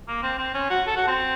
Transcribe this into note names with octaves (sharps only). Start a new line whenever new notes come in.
A#3
C4
C4
C#4
F#4
A4
F#4
C4